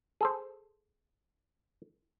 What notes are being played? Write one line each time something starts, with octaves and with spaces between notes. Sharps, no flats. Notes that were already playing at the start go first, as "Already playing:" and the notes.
G#4 A4 C5